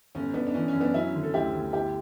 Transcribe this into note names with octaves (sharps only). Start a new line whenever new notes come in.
G1 C#4
G1 B3 D4
D4
E3 C#4
C#4
F#2
B3 D4
F#3 C#4 E4
D3
A4
D2 E4 G4
D2
G1 E4 G4